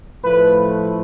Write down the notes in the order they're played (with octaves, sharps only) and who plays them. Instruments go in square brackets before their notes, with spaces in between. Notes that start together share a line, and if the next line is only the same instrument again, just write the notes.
[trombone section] A2 F3 A3 B4